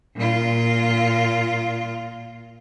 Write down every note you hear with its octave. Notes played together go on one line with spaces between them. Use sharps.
A#2 F4